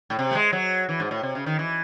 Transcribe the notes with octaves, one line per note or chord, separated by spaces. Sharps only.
A2
C3
A3
G#3
F#3
E3
G#2
A2
C3
C#3
D#3
E3